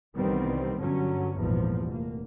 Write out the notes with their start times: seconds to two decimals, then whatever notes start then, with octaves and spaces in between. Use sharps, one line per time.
0.16 C2 D#3 E3 G3 B3 C4
0.77 G2 D3 F#3 C#4
1.37 G#1 E2 G2 A#2 F3 G3
1.85 F1 A#3